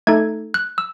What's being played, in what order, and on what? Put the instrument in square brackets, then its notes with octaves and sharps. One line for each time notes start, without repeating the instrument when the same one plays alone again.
[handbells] A3 D#4 A4 G#6
F#6
E6